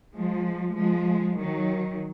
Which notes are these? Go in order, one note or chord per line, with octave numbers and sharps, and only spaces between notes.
F3 G#3
F3 G#3
D#3 F#3